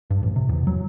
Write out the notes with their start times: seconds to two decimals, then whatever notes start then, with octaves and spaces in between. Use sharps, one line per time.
0.10 G2
0.23 A1
0.36 C3
0.49 E2
0.67 F#3